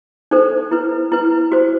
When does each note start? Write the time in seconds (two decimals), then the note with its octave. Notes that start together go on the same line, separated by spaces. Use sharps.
0.31 D#4 A4 C5
0.71 E4 B4
1.12 E4 B4
1.52 F#4 C5